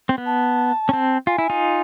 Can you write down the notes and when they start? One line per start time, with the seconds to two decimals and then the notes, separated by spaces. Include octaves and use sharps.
0.09 C4
0.18 B3
0.26 A5
0.89 C#4
0.93 C4
1.27 F4 G#5
1.38 E4
1.50 D#4 F4